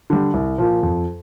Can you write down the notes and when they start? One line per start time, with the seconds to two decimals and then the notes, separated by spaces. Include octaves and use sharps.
0.10 D3 G3
0.34 C2
0.58 A#2 F3
0.83 F2